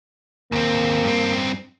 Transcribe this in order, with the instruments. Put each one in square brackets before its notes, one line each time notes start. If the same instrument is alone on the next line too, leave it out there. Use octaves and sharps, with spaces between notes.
[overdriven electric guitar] D#2 C4 [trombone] A#3
[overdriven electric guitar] G2 C4